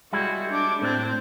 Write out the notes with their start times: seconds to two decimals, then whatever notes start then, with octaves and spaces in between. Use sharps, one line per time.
0.13 G3 G#3 E4 F#4
0.50 D4 D6
0.82 A2 C4 D4 C5